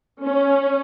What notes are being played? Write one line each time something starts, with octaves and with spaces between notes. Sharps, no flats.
C#4